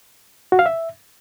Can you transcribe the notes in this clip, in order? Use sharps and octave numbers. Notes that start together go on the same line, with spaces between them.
F#4
F5
E5